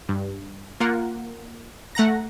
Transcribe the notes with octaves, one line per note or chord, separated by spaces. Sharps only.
G2
A#3 F4 A#4 F#5
A3 F#5 A#5 A#6